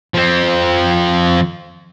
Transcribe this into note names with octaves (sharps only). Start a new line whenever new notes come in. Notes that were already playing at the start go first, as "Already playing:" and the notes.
F3 C4